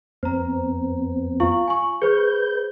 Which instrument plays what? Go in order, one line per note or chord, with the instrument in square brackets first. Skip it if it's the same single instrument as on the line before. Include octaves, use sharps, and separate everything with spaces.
[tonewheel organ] F2 B3 C4 [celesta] C5 A#5
[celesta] F4 F5 C#6
G#5 C#6
[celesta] G#4 C5 [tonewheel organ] B4 G6